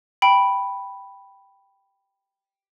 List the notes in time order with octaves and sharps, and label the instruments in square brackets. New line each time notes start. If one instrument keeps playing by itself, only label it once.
[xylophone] G5 B5